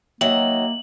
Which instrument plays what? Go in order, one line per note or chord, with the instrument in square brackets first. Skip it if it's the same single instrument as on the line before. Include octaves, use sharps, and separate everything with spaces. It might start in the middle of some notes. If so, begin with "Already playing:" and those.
[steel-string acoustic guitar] D#3 F#3 [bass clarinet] A#3 [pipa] E5 [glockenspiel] F#7